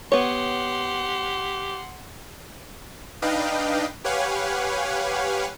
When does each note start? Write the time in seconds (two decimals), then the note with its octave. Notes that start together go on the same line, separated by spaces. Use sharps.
0.12 B3 G4 C#5 F#5 C6
3.22 D4 D#4 B4 D#5 F5 G5
4.04 G4 B4 C#5 F5 F#5 G#5